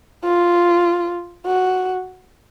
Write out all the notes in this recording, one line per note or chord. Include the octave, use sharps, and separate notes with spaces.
F4
F#4